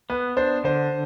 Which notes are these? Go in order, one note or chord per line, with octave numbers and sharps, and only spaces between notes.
B3 B4
D4 C5
D3 C5